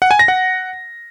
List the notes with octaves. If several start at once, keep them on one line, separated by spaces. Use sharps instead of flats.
F#5
G#5
A#6
F#5